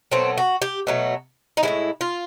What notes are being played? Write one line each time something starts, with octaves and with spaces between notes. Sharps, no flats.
B2 F#3 A3 C4
F#4
G4
B2 F#3 A3
D#4
A2 E3 G#3 E4
F4